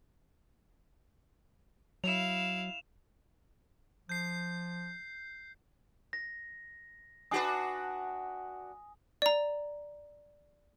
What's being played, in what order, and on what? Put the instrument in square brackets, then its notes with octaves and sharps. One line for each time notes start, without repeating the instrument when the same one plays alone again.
[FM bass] F#3 [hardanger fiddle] E4 F5 [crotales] E7 F7
[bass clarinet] F3 [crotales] G6 C7
[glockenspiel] A#6
[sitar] D4 F#4 B4 [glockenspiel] G#5 D#6
[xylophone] D5 A#5